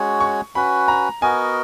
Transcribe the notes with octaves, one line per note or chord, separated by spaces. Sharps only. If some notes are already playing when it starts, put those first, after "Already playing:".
Already playing: G#3 C#4 F#4 C#5
C#6
C#4 F#4 B4 B5
A#5
B3 F#4 A#4 D#5 G#5